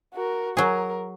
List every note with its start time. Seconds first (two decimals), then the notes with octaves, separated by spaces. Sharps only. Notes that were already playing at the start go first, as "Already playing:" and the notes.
0.14 F#4 A#4
0.57 F#3 G#4 A#4